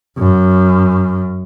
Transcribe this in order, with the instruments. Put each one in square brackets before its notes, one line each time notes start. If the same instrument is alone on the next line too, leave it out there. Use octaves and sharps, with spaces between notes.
[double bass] F#2